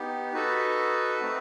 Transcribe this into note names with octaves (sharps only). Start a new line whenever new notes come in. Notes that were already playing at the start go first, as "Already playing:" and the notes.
Already playing: B3 D#4 G4
D#4 F#4 A4 B4
A3 C4 D#4 F#4